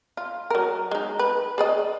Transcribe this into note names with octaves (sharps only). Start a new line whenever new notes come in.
F4
F#3 A#4
G#3 D#4
B4
G#4 D5 D#5